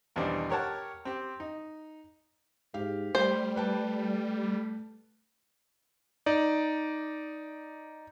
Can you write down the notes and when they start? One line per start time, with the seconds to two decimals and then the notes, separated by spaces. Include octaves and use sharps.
0.16 G#1 E2 B2 G3 D4 C5
0.50 G4 A#4 C#5 F#5 A5
1.05 C4 G4
1.40 D#4
2.74 G#2 G4 F5
3.15 G3 A3 C5
3.56 B4 G5 A5
6.26 D#4 D5